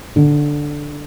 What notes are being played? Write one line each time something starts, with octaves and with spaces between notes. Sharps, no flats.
D3